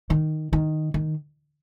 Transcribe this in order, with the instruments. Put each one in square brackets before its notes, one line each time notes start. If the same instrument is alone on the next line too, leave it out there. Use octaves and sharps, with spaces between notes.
[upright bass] D#3
D#3
D#3